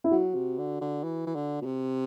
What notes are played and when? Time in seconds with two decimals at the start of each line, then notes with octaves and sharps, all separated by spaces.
0.04 E4
0.11 F#3 F#4
0.35 C3
0.58 D3
0.81 D3
1.04 E3
1.27 E3
1.35 D3
1.62 B2
1.66 C3